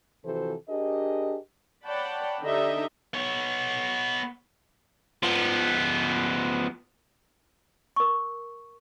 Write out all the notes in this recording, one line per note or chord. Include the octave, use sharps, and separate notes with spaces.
C3 E3 F3 F#4 A4 C5
D4 G4 G#4 A#4 D#5
C#5 D5 F#5 G5 A5 B5
D3 D4 D#4 G4 D#5 E5
B3 C#5
F3 B3
A#4 C#6